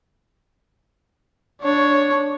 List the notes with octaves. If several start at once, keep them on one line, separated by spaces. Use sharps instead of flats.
D4 C#5